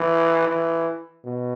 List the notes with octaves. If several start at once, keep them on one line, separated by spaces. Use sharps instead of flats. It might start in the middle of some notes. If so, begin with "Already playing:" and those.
Already playing: E3
E3
B2